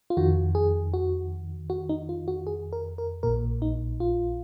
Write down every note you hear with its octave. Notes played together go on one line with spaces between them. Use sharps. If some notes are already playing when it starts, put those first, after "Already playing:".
F4
F2 D#3 F#4
G#4
F#4
F#4
D#4
F4
F#4
G#4
A#4
A#4
A#1 A#2 A#4
D#4
F4